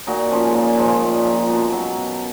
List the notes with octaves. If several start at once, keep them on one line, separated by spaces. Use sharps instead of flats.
A#2 D#4 F#4
F3 C#4 F4
G#3
A#2 A#3
F3 G#3
A#2
F3
B2
F#3
B2